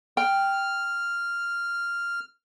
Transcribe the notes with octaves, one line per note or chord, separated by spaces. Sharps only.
G5 F6